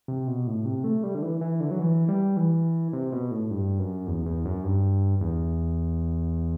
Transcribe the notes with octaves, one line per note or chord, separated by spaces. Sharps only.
C3
B2
A2
C3
A3
G3
D3
E3
E3
D3
F#3
E3
G3
E3
C3
B2
A2
G2
F#2
E2
E2
F#2
G2
E2